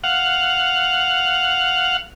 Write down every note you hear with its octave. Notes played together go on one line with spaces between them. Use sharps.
F5 F#5